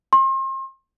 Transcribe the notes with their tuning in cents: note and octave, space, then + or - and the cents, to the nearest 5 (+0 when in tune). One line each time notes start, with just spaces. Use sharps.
C6 +40